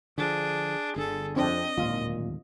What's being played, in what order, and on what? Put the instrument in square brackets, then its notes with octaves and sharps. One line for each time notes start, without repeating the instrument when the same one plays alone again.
[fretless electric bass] D3 F3 [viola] D4 G#4
[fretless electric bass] G1 D3 [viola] G#4 A4
[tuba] F2 [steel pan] C4 D4 [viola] D#5
[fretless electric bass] D1 G#1 D#2 [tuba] A#2 [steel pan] F4